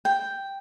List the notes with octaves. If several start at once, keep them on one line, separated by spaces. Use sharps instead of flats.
G5